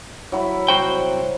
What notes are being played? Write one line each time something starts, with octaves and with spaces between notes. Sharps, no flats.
F#3 E4 B5
C2 F#4 C5 G5